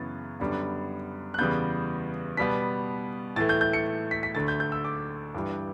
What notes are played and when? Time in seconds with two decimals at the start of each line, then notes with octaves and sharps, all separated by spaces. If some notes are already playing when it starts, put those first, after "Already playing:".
Already playing: F#2 C#3 E3 B3 A6
0.40 F#2 D3 G3 B3
1.34 F#6
1.38 E2 C#3 G3 B3 G6
2.37 B2 G3 B3 B6
3.36 A2 E3 A3 A6
3.49 G6
3.61 G6
3.73 C#7
4.11 B6
4.23 B6
4.35 D2 D3 A3 A6
4.48 G6
4.60 G6
4.72 E6
4.85 D6
5.35 G2 E3 G3